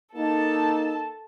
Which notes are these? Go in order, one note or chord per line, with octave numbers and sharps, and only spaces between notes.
A#3 D#4 A4 A5